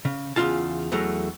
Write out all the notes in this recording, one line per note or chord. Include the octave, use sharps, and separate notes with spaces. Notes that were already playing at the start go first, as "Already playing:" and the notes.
C#3
E2 C#3 F3 D#4 F4 A5
E2 F#3 A3 A#5